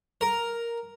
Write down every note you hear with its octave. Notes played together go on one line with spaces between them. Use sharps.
A#4